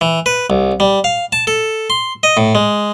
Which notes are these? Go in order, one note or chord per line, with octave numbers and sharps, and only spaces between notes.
E3
B4
C2
G3
F5
A5
A4
C6
D#5
A2
G#3